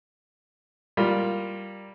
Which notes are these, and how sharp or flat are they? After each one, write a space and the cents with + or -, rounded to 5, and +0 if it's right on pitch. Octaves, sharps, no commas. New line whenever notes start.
G3 +0 A#3 +0 F4 +0